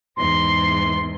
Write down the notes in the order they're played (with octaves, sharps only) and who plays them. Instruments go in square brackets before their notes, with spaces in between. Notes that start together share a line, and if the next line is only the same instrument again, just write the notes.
[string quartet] E2 G#2 [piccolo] C6